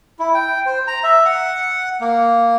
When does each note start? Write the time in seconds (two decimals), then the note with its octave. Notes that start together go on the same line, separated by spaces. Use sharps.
0.19 E4
0.35 G5
0.66 C5
0.87 A#5
1.04 E5
1.26 F#5
2.00 A#3